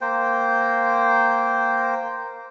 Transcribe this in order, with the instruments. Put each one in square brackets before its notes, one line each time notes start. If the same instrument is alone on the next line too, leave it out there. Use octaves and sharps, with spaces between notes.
[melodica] A#3 C5 G5